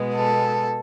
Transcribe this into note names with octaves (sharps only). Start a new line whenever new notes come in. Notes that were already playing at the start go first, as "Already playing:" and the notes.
Already playing: B2 G#3 B3
A4